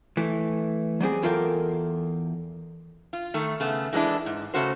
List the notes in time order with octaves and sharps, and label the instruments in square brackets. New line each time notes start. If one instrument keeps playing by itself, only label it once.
[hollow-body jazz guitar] E3 A3
F#3 G3 C4 G#4
E2 E4 F4 A4 A#4 G5
[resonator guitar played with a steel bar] F4
D#3 A3
C#3 A3 B3
E3 G#3 A#3 D4 E4
G#2
C#3 A3 C#4 F#4 C5